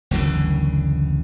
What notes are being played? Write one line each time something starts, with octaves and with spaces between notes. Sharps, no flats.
F#1 D2 C#3 E3